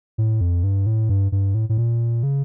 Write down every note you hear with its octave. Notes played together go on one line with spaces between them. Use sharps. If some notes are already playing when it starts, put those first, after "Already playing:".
A2
F2
G2
A2
G2
G2
A2
A2
A#2
C#3